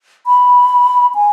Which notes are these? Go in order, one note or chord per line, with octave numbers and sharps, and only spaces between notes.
B5
G#5